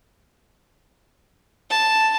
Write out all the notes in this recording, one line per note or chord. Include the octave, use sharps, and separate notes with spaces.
A5